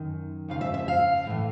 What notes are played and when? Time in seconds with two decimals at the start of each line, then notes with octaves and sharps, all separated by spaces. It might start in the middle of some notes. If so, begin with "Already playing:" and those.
Already playing: F#2 D#3
0.48 F2 C#3 F3 F5
0.61 E5
0.74 E5
0.88 F5
1.26 A2 E3